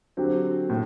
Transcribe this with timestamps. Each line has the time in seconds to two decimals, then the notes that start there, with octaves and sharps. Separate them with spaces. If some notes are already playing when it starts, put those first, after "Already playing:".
0.17 D3 F#3 C4 G4
0.70 A2